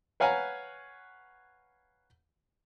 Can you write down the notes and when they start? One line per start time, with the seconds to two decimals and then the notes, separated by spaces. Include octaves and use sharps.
0.20 B4 C#5 F5 F#5 G#5 A#5